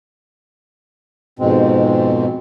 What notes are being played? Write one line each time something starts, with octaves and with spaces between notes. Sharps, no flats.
F2 G#2 B2 G#3 C4